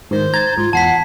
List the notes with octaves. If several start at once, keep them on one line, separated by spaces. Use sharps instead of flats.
G#2 D#3 C5
A#5 G#6 A6
G#2 F4
E2 F#5 A5 B6 C7